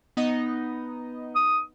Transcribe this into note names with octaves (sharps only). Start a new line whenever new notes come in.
B3 D#4 D#5
D#6